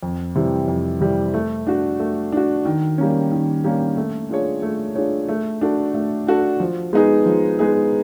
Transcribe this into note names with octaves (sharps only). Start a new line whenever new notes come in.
F2
C3 E3 G3
F2
C3 E3 G3
A3
D4 F#4
A3
D4 F#4
D#3
G3 A#3 C#4
D#3
G3 A#3 C#4
A3
D4 F4 G#4 C#5
A3
D4 F4 G#4 C#5
A3
D4 F#4 A4
A3
D4 F#4 A4
F3
G#3 B3 D#4 G#4
F3
G#3 B3 D#4 G#4